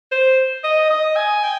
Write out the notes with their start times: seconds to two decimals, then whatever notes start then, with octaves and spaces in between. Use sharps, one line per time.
0.12 C5
0.64 D#5
0.90 D#5
1.16 G#5
1.43 G5